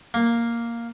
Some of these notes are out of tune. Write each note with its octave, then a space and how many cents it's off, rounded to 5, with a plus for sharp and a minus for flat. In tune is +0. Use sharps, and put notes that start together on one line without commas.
A#3 +0